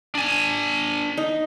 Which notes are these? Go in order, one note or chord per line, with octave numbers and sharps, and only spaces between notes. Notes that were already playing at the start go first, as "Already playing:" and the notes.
D4 G#5
D#4